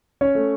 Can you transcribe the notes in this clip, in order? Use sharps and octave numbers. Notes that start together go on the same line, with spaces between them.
C#4 C#5
A3